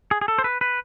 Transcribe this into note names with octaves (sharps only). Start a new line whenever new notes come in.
G#4
G#4
A4
C5
B4
B4